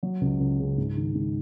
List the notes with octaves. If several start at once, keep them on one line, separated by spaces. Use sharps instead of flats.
F#3
C#2
C#2
C#3
G#2
D#3
G#2